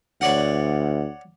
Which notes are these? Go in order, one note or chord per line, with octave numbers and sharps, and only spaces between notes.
D2 C#5 D5 F#5